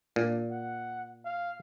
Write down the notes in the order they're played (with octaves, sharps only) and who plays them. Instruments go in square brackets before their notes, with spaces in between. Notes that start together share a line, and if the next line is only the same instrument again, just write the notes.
[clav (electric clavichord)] A#2 [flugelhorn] D4
[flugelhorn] F#5
F5